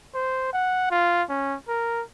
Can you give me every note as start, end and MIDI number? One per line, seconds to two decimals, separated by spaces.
0.14 0.51 72
0.53 0.87 78
0.91 1.23 65
1.29 1.56 61
1.68 2.03 70